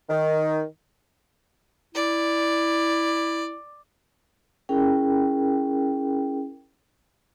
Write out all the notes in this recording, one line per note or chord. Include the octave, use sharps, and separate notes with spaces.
D#3
E4 D5
C#4 E4 G#4 A#4 G5